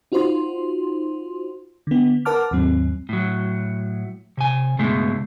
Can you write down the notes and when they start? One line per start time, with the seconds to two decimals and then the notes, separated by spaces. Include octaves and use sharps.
0.12 D#4 F4 F#4 C5 C6
1.87 D3 B3
2.25 A#4 B4 F#5 A5 D6 F6
2.51 D#2 G#2 F#3 C4
3.09 A2 F#3
4.37 C3 G#5
4.79 C#2 G2 B2 G#3 A3